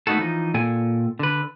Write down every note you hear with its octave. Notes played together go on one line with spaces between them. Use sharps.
A3 B3 D#4 F4 F#4 A4
E3 F3 D#4
A#2 A4 G5 G#5
D3 B4